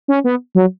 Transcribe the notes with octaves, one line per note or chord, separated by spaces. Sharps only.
C#4
B3
F#3